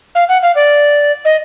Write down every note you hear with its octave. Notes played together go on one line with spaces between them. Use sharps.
F5
F#5
F5
D5
D#5